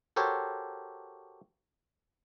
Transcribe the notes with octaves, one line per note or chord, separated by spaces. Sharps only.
F#4 G4 A4 A#4 C5 C#5